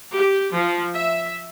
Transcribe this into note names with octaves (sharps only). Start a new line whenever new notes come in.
G4
F3
E5